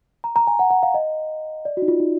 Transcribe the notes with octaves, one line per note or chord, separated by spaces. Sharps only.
A#5
A#5
G#5
F#5
F#5
F5
D#5
D5
F#4
D#4
F4
D#4